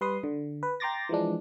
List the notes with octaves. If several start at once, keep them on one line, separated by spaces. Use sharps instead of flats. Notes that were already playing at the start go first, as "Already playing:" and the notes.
G3 B4 C6 D#6
D3
B4
G5 A#5 C6 D6 A6 A#6
E3 F3 G#3 D4